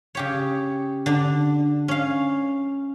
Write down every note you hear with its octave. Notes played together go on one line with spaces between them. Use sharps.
C#3 G4 C#5
D3 D4
C#4 F5